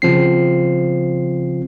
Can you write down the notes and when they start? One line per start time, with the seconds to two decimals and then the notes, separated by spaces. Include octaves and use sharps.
0.02 C#3 F3 C4 C7